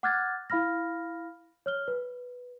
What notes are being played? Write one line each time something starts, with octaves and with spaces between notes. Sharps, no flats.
F#5 D6 F6 F#6 G#6 A6
E4 F5 B5 F6 A#6
C#5 F6 G7
B4